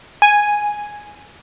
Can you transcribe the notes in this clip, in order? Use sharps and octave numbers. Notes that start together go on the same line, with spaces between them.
G#5